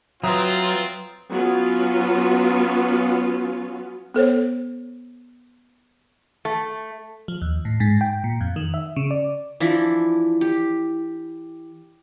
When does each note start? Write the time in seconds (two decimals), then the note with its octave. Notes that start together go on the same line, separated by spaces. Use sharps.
0.24 F#3 C4 F4 B4 E5 A#5 D#6
1.30 F#3 B3 C#4 F4
4.14 B3 A4 C5 C#5
6.45 A3
7.28 F3
7.42 D#2
7.65 A2
7.80 G#2
8.01 G5
8.24 A#2
8.41 F2
8.56 D#3
8.74 E5
8.96 C#3
9.11 D5
9.60 E3 F3 D4 E4
10.41 G4